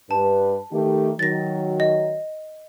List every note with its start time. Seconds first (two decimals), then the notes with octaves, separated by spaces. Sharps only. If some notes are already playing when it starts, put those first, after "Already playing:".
0.11 G2 B4 A5
0.73 D#3 A3 G4
1.19 D#3 F#3 A6 A#6
1.80 D#5